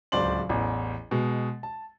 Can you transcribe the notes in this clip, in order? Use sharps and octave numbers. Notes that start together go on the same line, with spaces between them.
D1 C#2 C5 D5 C6 F#7
A1 E2
B2 G#3
A5